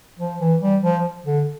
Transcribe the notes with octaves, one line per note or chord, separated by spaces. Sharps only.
F3
E3
G3
F3
D3